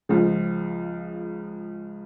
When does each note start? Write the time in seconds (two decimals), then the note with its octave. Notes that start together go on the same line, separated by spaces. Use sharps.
0.09 C#2 C#3 F3